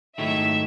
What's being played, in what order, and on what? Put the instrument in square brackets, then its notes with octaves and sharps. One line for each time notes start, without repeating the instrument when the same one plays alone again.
[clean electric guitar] G#2 D#3 F#3 A3 E4 [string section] E5